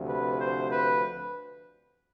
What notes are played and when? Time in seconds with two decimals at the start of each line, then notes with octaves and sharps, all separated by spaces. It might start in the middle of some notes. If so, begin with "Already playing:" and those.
Already playing: D2 C3 F3
0.08 B4
0.40 C5
0.72 B4